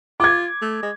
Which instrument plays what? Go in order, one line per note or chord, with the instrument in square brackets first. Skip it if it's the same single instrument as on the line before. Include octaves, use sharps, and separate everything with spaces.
[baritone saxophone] F4 [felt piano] D6 G#6
[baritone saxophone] A3
G#3